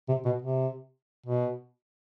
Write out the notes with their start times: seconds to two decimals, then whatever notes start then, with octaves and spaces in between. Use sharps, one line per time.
0.09 C3
0.25 B2
0.42 C3
1.26 B2